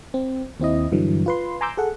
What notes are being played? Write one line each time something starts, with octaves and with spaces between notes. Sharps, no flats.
C4
D#2 C4 E4 D#5
G2 D3 E3 F#3
F4 B4 C6
G#5 A#5 C6 D6 E6 G6
G#4 A4 F#5